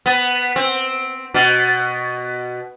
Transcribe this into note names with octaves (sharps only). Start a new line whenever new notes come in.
B3
C4
B2